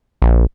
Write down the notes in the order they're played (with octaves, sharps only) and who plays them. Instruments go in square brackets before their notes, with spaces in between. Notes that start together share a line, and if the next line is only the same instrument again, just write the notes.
[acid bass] A#1